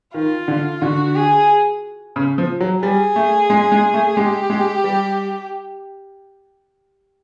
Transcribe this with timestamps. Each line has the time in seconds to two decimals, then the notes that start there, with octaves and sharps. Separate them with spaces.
0.14 D#3 F4
0.48 D3
0.82 D3 F#4
1.15 G#4
2.16 C#3
2.38 F3
2.60 F#3
2.83 G3 G#4
3.16 A3
3.50 G#3
3.72 G#3
3.94 A3
4.16 G#3 G4
4.50 G#3
4.84 G3